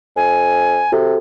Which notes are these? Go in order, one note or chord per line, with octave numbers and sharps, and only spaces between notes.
F2 G#5
C3 F#4 A4